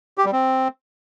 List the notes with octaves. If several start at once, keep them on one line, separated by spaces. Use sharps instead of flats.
G4
G3
C4